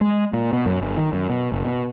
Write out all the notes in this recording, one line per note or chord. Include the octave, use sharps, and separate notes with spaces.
G#3
A#2
B2
F#2
G1
D#3
F#2
B2
F#1
B2